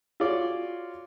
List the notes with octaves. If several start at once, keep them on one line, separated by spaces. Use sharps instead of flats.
F4 F#4 G#4 C#5 D5